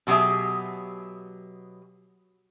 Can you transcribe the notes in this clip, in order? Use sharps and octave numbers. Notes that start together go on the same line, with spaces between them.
B2 F#3 G4 G#4 E5